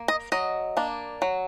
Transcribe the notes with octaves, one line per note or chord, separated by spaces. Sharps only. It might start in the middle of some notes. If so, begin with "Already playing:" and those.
Already playing: A#3
D#5
F#3 D#5
A#3 D4
F#3